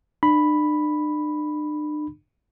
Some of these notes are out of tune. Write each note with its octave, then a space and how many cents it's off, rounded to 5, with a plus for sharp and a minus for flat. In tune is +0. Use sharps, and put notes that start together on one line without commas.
D4 +40 B5 +0